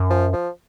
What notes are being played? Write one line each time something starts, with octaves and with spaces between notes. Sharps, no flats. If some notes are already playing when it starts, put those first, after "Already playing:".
Already playing: F#2
F3
F3